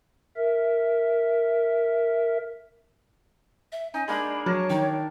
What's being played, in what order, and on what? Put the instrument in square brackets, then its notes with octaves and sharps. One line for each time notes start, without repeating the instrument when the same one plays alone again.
[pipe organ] A#4 E5
[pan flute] E5
[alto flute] C#4 [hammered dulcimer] D#4 [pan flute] G#5
[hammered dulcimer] G#3 A#3 D4 [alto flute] D5 [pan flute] B5
[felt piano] F#3 [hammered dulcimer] A#4 A5 [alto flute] C#5
[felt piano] D#3 [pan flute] D#4